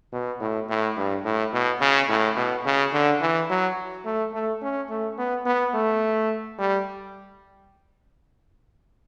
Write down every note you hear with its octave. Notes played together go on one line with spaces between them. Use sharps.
B2
A2
A2
G2
A2
B2
C#3
A2
B2
C#3
D3
E3
F#3
A3
A3
C#4
A3
B3
B3
A3
G3